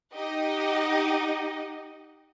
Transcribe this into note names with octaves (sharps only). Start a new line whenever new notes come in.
D#4 G4 D#5 F#5